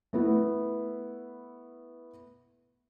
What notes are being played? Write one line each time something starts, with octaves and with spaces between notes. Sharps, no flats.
A3 B3 E4